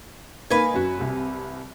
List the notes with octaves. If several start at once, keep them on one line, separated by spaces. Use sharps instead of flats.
A#3 D#4 B4 G#5
F#2 F#4
C2 C3